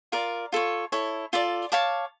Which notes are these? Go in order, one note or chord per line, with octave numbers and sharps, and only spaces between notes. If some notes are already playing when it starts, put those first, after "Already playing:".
F4 A#4 D5
F4 A4 C#5
E4 A4 C#5
F4 A4 D5
C#5 F5 A5 D6